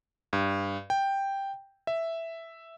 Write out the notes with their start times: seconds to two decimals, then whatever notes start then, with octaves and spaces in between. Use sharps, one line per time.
0.33 G2
0.90 G5
1.87 E5